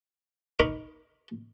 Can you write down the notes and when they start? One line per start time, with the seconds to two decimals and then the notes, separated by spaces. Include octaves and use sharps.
0.59 D#4 A#4 B5 C#6 D6